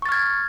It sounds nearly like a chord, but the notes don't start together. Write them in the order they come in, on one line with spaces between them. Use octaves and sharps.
C#6 A6 F6 G#6